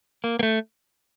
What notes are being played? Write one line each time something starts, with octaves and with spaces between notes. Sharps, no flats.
A#3
A#3
A3